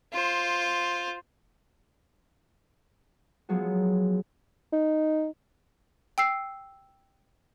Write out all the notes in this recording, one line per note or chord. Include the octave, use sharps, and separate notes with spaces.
F4 C5
F3 F#3 G#3 B3 F#4
D#4
G5 E6 C7